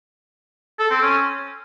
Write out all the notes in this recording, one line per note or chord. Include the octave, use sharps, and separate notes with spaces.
A4
C4
C#4